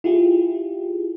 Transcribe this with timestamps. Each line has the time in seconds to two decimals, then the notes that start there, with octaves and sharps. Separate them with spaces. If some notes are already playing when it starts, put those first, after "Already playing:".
0.04 E4 F4 G4 G#4